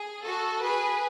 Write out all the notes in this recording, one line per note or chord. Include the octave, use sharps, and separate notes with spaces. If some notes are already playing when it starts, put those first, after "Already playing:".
Already playing: G#4
F#4 A4
G#4 B4